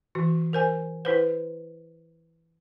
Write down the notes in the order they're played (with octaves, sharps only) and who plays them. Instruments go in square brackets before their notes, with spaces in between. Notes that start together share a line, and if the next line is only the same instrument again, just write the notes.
[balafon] E3 F#4
A#4 C5 G#5
E4 B4 C5